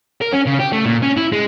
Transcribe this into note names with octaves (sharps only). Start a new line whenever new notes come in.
A#4
C#4
C#3
G4
A3
A#2
C#4
E4
G#3